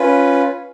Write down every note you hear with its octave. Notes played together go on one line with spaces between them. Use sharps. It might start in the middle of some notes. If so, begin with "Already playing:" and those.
Already playing: C#4 F4 B4